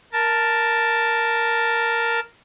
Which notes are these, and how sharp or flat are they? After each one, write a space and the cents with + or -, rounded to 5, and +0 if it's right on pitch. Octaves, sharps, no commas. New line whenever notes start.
A#4 +0 A5 +5